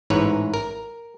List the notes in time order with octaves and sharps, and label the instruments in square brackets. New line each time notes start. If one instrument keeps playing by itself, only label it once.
[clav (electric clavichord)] A1 G#2 E3 B4 C#5 A#5
A#4